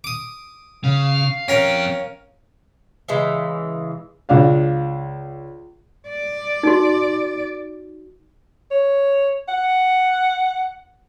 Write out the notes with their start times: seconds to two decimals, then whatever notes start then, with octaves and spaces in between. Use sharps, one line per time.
0.04 D6 D#6
0.84 C#3 F5
1.48 F2 C#4 A#4 G5
3.08 C#3 E3 G#3
4.29 C#2 D4 F5
6.09 D5
6.63 D#4 F#4
8.71 C#5
9.49 F#5